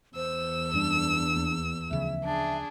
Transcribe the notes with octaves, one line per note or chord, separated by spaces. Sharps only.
E2 C5 E6
F#2 G3 D4
D#2
D2 C#3 F3 E5
D4 G#4